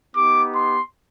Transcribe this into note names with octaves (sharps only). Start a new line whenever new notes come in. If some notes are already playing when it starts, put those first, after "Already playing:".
B3 D#4 G4 D6
C6